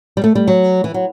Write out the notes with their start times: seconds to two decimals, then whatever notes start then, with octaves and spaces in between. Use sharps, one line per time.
0.17 G3
0.24 A3
0.35 G3
0.48 F#3
0.84 E3
0.94 F#3